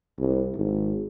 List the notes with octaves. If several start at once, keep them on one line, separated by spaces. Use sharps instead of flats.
C2
G#1